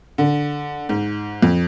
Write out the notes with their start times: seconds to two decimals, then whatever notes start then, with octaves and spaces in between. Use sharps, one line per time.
0.18 D3
0.89 G#2
1.42 F2